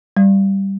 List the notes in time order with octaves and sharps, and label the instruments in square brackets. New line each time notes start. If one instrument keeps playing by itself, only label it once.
[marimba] G3